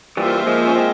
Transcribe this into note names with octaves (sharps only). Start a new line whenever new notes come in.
E3 G3 A#3 F4 C5 E5
F3 G#3
C#4
G#3 C4